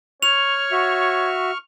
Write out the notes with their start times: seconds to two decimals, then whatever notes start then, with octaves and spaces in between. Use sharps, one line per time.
0.23 C#5 C#6 F6 F7
0.72 F#4 E5